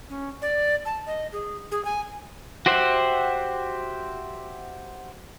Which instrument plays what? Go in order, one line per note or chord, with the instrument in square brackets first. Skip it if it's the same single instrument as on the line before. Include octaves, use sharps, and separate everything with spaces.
[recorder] C#4
D5
A5
D#5
G#4
G#4
G#5
[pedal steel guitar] F#4 G4 C5 E5 F#5